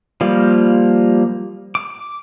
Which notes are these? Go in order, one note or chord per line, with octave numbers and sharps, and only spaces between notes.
F3 G3 A#3
D6